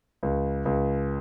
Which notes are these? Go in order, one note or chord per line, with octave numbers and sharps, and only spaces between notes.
C#2
C#2